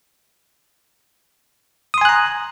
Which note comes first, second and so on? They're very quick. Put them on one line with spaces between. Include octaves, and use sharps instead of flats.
D#6 C6 G#5 F#6 A#5